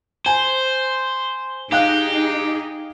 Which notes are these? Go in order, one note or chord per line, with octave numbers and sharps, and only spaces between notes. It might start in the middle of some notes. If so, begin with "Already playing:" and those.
C5 G#5
D#4 G4 G#4 F5 G5 F#6